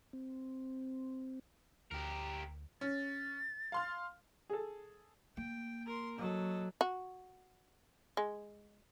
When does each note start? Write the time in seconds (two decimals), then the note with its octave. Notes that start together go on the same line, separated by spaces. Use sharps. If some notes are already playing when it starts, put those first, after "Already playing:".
0.13 C4
1.91 D2 G4 A#4
2.81 C#4 A6
3.72 F5 C6 F6
4.50 G#4 A4
5.37 A#3 G5
5.87 A#4 C6
6.19 F#3 A4 D#5
6.81 F#4
8.17 G#3